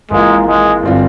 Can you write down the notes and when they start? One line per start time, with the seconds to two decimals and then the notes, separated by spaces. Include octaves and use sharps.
0.11 G#1 G#2 E3 G#3 A#3 F4
0.47 G#3
0.83 G1 G3 C4 F4